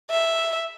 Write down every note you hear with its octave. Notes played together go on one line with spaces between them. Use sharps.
E5